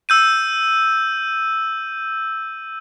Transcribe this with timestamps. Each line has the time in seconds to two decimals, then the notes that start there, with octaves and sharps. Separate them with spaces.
0.09 E6 G6 D#7